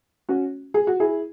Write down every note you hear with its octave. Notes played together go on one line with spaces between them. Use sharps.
C#4 F#4
G#4
F#4
E4 G#4